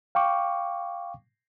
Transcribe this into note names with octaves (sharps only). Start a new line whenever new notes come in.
F5 G5 C#6 D6